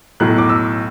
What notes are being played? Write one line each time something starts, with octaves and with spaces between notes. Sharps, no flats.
B1 A2 F#3 F#6
D6
E6